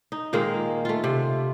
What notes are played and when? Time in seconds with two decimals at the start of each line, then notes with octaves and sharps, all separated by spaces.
0.12 D#4
0.33 A#2 D#3 G#3 A#3
0.85 A3 F4
1.04 C3